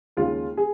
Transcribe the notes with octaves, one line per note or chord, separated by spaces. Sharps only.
D#2 C#3 G#3 F4
G#4